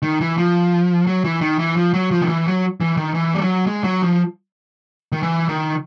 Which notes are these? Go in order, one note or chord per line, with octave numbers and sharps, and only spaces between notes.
D#3
E3
F3
F#3
E3
D#3
E3
F3
F#3
F3
D#3
E3
F#3
E3
D#3
E3
G3
F#3
G#3
F#3
F3
D#3
E3
D#3